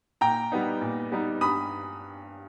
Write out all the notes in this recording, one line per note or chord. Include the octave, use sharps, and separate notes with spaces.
A#2 G5 A#5
G3 B3 D#4
A#2
G3 B3 D#4
G2 B5 D#6